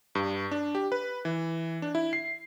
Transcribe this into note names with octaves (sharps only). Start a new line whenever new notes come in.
G2
D4
G4
B4
E3
D4
E4
C7